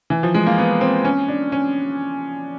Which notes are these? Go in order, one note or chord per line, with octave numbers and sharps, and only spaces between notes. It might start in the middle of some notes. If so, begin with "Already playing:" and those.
E3
F3
G#3
A#3
B3
C4
C#4
D4
C#4